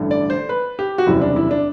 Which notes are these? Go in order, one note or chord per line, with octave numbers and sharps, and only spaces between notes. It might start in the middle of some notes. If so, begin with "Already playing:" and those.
Already playing: A1 G2 D3 A3
D5
C5
B4
G4
F#4
F#1 E2 C3 G3 E4
D4
E4
D4